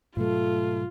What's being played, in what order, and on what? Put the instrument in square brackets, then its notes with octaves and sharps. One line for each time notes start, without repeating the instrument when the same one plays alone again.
[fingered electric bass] G#2 B2 F#3 [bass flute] A3 [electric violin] F4